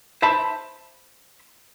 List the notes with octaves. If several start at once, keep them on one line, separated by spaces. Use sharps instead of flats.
C5 E5 A5 B5